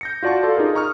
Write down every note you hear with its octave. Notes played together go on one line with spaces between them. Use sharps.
G6 A#6 C#7
F4 F#4 D5 A5 C#6
A4 D5 F5 C6 D6
D#4 F4 G#4 A#4
A#5 C#6 D#6 F6